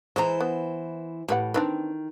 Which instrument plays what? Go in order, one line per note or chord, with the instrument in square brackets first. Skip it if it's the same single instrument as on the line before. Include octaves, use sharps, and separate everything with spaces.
[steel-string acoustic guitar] E3 E4 C5 [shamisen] G#3 C#5 A#5
[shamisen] B3
[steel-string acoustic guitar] A2 [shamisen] G4 B4 F#5
[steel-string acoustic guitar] D#3 [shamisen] C4 D4 B4